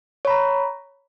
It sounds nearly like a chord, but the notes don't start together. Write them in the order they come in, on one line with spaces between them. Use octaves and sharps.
C#5 B5 A#5